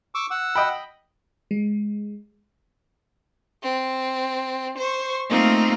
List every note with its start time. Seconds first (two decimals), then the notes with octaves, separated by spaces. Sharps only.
0.15 C#6 D6 E6
0.31 F#5 E6
0.55 D#5 G5 B5
1.51 G#3
3.63 C4
4.78 C5 C#6
5.29 A3 A#3 C4 D#4 F4